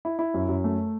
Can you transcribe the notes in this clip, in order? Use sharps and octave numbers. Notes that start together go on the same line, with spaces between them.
E4
E4
F#2
F#2
A3